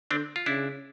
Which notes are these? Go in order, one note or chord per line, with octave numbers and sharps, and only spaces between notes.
D3 C4 D4
F4
C#3 D4 E4